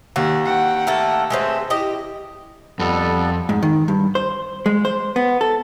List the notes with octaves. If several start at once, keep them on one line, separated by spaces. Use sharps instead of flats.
D#2 F#4
F#5 G5
A3 A#3 A4
G#3 A3 C4 B4
E4 G4 D#5
F2 G3 B3 A4
G#2
D#3
G2
C5
G#3
C5
B3
A4